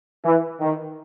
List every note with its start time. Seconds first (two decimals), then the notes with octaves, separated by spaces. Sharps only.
0.24 E3
0.60 D#3